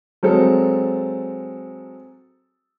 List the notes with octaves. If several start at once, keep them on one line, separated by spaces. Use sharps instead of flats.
F#3 G#3 C4 A4